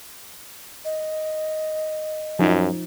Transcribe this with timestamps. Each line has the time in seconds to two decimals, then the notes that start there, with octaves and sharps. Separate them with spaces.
0.85 D#5
2.39 F#2 F3 D#4